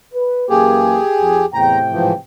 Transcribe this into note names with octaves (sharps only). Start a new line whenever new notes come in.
B4
F#2 E3 A#3 G4 G#4
F2
E2 A2 C3 G5 A#5
G#2 E3 F3